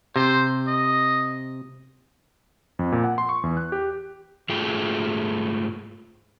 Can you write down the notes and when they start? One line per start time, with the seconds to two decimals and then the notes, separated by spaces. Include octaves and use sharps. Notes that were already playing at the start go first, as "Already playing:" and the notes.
0.16 C3 C5
0.68 D#5
2.79 F2
2.92 A#2
3.04 F#5
3.18 C6
3.29 C#6
3.43 E2
3.57 F#6
3.72 G4
4.49 G#2 A3 F4 G#4 G5